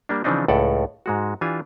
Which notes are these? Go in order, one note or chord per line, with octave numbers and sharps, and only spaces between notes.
G3 A#3 D4
C#3 E3 F3 C4 D4 D#4
C#2 A2 A4 D5 F#5
G#2 G#3 F#4
E3 D4 F4 G4 G#5